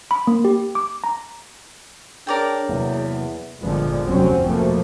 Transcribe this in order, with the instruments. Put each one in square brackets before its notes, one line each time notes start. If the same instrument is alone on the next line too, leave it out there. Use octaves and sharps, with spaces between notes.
[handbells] B5
A#3
G4
D6
A#5
[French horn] D4 [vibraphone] G#4 C#5 [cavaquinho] A#4 D5 G5
[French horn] E2 [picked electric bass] C3 F#3 A#3
[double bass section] G1 A#2 D3 F3 G#3 B3
F1 D2 C3 F#3 C4 C#4
B2 F3 A3 A#3